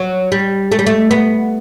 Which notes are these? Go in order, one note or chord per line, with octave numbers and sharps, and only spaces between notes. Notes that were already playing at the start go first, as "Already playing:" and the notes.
Already playing: F#3
G3
A3
G3
A3
B3